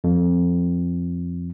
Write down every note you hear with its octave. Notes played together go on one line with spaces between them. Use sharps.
F2